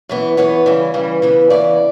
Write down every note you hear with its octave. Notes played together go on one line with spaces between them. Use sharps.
F#2 E3 B3
F#2 E3 B3 C#5
C#3 E3 G3
C#3 E3 G3
C#3 E3 B3
C#3 E3 B3 D5